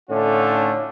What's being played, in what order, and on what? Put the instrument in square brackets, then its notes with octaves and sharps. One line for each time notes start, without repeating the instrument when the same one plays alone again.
[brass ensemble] A2 D3 A3 C#4 D#4 F4